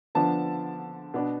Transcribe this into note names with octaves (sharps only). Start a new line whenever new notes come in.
D3 F3 B3 D4 A5
B2 B3 D4